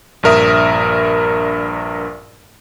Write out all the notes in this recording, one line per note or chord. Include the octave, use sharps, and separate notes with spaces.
A#1 G2 A#4 E5 D#6